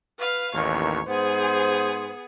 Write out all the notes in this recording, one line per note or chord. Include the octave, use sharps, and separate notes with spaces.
B4 F5
A1 D#2 C#5
G#2 B3 G#4 C5